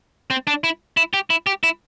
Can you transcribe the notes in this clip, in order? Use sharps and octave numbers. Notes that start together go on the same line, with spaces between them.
C4
D4
E4
E4
G4
E4
G4
E4